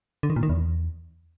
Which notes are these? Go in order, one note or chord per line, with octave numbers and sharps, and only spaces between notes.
D3
D#3
A#2
D#3
E2